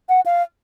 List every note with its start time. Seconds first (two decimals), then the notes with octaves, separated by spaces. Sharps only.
0.09 F#5
0.26 F5